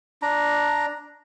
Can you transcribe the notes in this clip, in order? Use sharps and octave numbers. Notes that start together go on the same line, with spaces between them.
D4 A#5